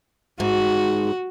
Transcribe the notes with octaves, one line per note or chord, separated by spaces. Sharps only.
G#2 F#4